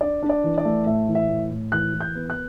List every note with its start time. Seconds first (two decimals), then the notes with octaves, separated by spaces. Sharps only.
0.01 D4 D5
0.23 D4
0.29 D5
0.44 E3
0.58 D5
0.65 A3
0.86 A2 E5
1.08 E3
1.15 E5
1.29 A2
1.51 A2
1.72 E3 F#6
1.93 E3
2.01 G6
2.15 B3
2.30 F#6